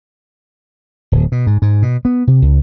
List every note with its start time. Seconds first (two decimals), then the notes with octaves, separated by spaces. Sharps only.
1.12 D1
1.32 B2
1.47 G#2
1.62 G#2
1.82 B2
2.05 B3
2.27 C3
2.42 C#2